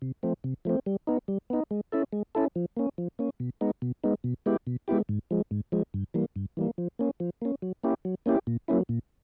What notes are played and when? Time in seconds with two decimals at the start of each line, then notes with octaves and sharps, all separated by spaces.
0.02 C3
0.23 F3 A3 C4
0.44 C3
0.65 F3 A3 C4
0.86 G3
1.07 B3 D#4
1.28 G3
1.50 B3 D#4
1.71 G#3
1.92 C#4 E4 A4
2.13 G#3
2.35 C#4 E4 A4
2.56 F3
2.77 A#3 C#4
2.98 F3
3.19 A#3 C#4
3.40 B2
3.61 G#3 B3 D#4
3.82 B2
4.04 G#3 B3 D#4
4.24 B2
4.46 G#3 B3 E4 G4
4.67 B2
4.88 G#3 B3 E4 G4
5.09 G#2
5.31 F3 G#3
5.51 G#2
5.72 F3 G#3
5.94 G2
6.14 E3 G3 A#3
6.36 G2
6.57 E3 G3 A#3
6.78 F3
6.99 A#3 C#4
7.20 F3
7.42 A#3 C#4
7.62 F#3
7.83 A#3 C#4 E4 G4
8.05 F#3
8.26 A#3 C#4 E4 G4
8.47 A#2
8.68 F#3 A#3 C#4 E4
8.89 A#2